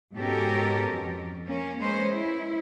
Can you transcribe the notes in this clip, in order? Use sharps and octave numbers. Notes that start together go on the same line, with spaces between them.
G#2 B2 C#4 G4 A4 A#4
F2
A#3 C#4
G#3 A#3 C#4 B4 C5
E4